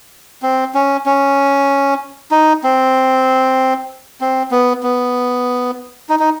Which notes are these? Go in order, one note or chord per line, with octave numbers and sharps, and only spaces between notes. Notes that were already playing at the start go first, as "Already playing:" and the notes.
C4
C#4
C#4
D#4
C4
C4
B3
B3
D#4
D#4